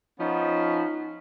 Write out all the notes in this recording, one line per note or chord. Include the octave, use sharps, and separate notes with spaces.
F3 B3 C#4 D#4